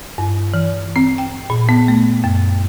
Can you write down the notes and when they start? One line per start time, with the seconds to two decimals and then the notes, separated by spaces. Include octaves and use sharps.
0.18 G2
0.54 E3
0.96 C4
1.18 G5
1.50 A#2
1.69 B3
1.88 A3
2.24 F#2